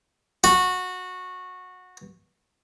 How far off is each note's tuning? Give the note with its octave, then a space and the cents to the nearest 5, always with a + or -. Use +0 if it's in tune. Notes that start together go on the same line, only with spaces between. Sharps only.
F#4 -15